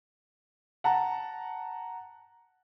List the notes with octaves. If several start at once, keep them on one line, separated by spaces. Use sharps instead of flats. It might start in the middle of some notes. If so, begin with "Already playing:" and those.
F#5 A5 A#5